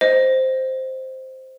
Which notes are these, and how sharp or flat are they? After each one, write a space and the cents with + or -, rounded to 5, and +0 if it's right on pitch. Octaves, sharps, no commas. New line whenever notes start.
C5 +0 D#5 +5